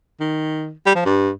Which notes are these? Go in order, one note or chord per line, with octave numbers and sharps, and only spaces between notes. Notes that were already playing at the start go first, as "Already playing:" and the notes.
D#3
G3
F3
G2